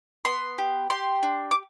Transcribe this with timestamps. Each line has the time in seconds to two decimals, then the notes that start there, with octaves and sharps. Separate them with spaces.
0.25 B3 C6
0.58 G4
0.90 G4 C6
1.23 D4
1.51 D6